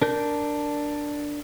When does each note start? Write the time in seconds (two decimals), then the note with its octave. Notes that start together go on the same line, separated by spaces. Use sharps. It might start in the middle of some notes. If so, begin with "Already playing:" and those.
0.02 D4 A#4 G6